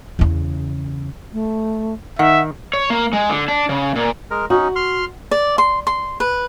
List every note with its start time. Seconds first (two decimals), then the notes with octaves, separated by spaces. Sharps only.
0.19 E2 C#3
1.33 A3
2.19 D#3 D#4 E5 F#5
2.73 C#5
2.90 A#3
3.13 G#3
3.30 D3
3.48 D4
3.69 C#3
3.96 A#2
4.31 G#3 A#4
4.50 C#4 D#4 F#4
4.76 C6 F6
5.31 D5
5.58 C6
5.87 C6
6.20 B4